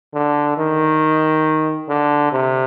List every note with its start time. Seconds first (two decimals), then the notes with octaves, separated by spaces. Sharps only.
0.14 D3
0.58 D#3
1.89 D3
2.32 C3